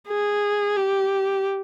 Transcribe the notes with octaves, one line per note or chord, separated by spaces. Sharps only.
G#4
G4